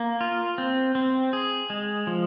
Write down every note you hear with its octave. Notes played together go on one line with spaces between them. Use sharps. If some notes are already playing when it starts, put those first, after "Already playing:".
Already playing: A#3
F4
C4
C4
G#4
G#3
F3